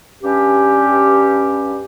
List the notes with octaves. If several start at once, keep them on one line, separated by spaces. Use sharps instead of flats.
G2 C#4 G4